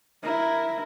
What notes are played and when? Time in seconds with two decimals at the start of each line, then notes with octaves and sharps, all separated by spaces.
0.23 E4 A#4